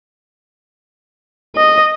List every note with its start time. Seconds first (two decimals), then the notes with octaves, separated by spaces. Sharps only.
1.56 D#5